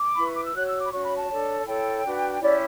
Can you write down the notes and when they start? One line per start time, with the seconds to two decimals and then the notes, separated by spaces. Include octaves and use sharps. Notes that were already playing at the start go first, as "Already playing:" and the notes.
Already playing: D6
0.16 E4 B4 B5
0.26 C#6
0.35 D6
0.44 E6
0.54 F#4 C#5 F#6
0.66 E6
0.79 D6
0.85 B5
0.91 C#4 F#4 C#5 C#6
1.04 B5
1.16 A5
1.29 D4 A4 C#5
1.65 E4 A4 C#5 G5
2.03 D4 F#4 B4
2.40 C#4 E4 G4 C#5 D5